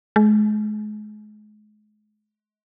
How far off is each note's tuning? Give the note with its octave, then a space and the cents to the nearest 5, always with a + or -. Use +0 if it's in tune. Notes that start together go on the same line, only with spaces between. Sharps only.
G#3 +35